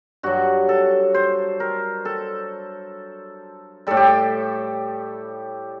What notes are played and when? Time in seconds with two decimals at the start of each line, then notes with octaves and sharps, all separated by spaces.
0.23 G2 F#3 F#4
0.69 A4
1.14 C5
1.60 A#4
2.05 A4
3.87 A2 G3 A4
3.97 G4
4.07 A4